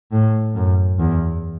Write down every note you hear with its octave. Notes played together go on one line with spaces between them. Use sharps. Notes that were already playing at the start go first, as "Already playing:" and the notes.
A2
F#2
E2